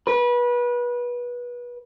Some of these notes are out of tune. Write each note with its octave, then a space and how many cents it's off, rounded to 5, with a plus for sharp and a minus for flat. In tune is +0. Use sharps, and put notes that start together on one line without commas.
B4 -25